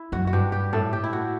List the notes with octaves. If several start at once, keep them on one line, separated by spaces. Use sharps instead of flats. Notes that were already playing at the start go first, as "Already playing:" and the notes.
Already playing: E4
F#2 F#4
F#4
G2 G4
G4
A2 A4
G4
E4
F#4